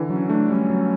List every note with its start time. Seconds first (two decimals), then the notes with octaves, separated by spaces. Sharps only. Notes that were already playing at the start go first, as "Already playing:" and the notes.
Already playing: D3 E3
0.10 F#3 C#4
0.29 A3 D4
0.49 G3 C#4
0.70 F#3